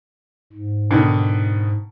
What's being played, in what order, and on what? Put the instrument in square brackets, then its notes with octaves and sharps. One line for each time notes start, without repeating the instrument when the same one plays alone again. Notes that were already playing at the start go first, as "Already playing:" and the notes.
[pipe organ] G#2
[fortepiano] B2 D3 D#3